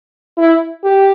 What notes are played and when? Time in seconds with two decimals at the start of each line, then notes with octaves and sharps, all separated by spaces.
0.38 E4
0.84 G4